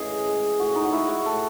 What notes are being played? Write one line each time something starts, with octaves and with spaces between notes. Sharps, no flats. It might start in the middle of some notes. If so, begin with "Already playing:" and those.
Already playing: A2 C#3 E3 G#4 D#5
G#3
A2 F#4
D#4
F#4
G#3 E4
F#4
A2 A4